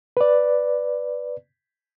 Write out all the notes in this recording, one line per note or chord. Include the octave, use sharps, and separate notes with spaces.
B4 D5